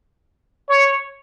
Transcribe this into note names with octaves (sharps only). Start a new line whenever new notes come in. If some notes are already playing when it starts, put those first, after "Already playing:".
C#5